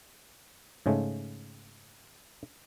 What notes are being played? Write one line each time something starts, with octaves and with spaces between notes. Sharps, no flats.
G#2 C#3 G#3 A3